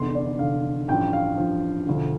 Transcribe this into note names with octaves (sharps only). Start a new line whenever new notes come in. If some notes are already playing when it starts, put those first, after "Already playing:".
Already playing: F1 E2 D3 C6
D5
F1 E2 D3 F5
A1 G2 F3 G5
F5
A1 G2 F3
E1 D2 D3 F3